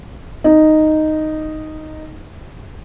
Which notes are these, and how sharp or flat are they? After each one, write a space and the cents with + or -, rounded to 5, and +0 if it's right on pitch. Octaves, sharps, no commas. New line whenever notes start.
D#4 -5